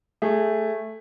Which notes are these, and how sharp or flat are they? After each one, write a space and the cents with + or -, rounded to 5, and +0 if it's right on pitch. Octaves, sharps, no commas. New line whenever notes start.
A3 +0 G#4 -15